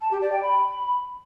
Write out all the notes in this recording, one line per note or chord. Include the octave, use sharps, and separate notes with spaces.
A5
G4
D5
G5
B5